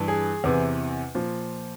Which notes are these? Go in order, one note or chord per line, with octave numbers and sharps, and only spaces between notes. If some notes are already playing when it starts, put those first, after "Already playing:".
Already playing: G2 E3
G#4
E2 C3 E3
A#2 F3